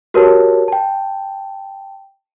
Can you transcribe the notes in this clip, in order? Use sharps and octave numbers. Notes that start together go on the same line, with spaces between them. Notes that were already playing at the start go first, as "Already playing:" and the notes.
F#4 G4 A#4 B4 C#5 A5
G5 A5